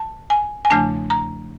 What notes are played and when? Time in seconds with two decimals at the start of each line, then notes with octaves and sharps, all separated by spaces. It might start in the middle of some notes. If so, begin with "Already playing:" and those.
Already playing: A5
0.30 G#5
0.65 G#5
0.70 E2 C#3 F3 A3 D4 A5
1.10 A#5